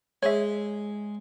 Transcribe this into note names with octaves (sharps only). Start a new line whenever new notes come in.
G#3 C#5 E5